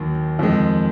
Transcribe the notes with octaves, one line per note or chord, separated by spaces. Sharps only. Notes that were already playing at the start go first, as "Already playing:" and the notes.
Already playing: D#2 D#3 F#3
F2 D#3 G#3